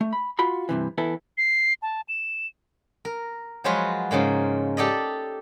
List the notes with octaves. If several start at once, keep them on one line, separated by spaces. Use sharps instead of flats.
A3
B5
F4 F#4 B5 C6
G2 C3 E3
E3 B3 E4 A4
C7
A5
E7
A#4
F3 F#3 G#3 F4 F#4 B4
G#2 C#3 G#3 A#3
G4 A4 D5 D#5